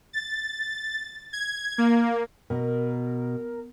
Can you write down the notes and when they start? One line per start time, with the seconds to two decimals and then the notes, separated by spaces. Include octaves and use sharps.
0.13 A6
1.33 G#6
1.78 A#3
2.50 B2 A#4